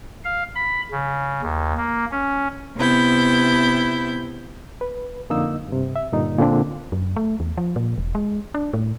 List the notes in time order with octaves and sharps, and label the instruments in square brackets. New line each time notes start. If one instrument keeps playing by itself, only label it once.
[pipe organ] F5
B5
C#3
D#2
A#3
C#4
[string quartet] C3 B3 E4 G6
[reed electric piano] B4
F2 D3 A#3 D#4 D#5 E6
G2 C3
E5
G2 A#2 D3 D#4
A#2 D3 C4 D4
[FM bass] F#2
A3
E2
F3
A#2
E1
G#3
D4
A2